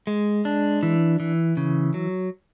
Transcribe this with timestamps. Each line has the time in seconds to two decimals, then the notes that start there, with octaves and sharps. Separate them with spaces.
0.07 G#3
0.45 D4
0.83 E3
1.20 E3
1.57 C#3
1.94 F#3